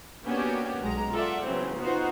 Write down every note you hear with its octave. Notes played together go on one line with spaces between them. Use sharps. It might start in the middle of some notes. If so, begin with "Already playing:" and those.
A#3 B3 C#4 D4 F#4 G4
B1 G#3 A#5
F4 A4 D5 E5 F#5
C#3 E3 F#3 B3 C4
B3 D#4 F4 F#4 C5